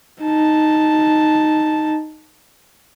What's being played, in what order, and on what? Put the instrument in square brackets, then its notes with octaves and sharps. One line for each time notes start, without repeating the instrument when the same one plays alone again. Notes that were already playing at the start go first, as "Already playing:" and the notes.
[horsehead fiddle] D#4 A5